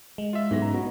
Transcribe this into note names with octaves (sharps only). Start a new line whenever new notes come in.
G#3
F4 E5
B1 G#2 E3 B3 A#6
C#2 A#5
B2